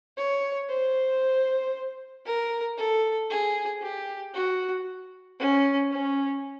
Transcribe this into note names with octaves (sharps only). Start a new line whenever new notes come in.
C#5
C5
A#4
A4
G#4
G4
F#4
C#4
C#4